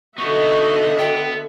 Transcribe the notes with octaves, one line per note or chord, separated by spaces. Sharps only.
D3 B3 D#4 F#4 D#5 E5 C#6
B3 G5